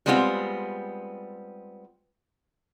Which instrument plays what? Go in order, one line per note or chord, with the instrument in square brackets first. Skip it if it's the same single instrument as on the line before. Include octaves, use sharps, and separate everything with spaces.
[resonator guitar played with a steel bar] G3 G#3 B3 C4 E4 F4